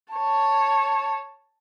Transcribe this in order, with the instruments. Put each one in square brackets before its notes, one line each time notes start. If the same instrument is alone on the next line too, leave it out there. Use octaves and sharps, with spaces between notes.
[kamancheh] C#5 A5